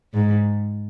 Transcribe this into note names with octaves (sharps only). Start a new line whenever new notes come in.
G#2